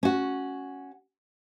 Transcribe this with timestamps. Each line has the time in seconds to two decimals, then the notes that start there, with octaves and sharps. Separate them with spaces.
0.03 C#4 F#4